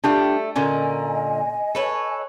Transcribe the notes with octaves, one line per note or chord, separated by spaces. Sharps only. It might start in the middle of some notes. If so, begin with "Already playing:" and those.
G3 A3 D4 F4 G4
A#2 D3 A#3 C#4 D#5 G#5
A4 B4 C#5